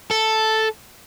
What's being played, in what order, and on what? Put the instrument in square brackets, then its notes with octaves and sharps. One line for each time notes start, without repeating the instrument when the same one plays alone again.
[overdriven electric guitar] A4